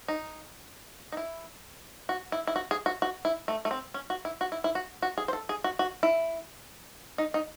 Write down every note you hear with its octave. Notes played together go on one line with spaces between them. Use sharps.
D#4
D#4
E4
F#4
E4
E4
F#4
G#4
F#4
F#4
E4
A3
A3
C4
C#4
F#4
E4
F#4
E4
E4
F#4
F#4
G#4
C5
A4
G#4
F#4
F#4
E4
D#4
D#4